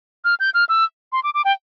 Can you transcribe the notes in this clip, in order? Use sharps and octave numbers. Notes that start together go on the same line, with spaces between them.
F6
G6
F6
E6
C6
D6
D6
G5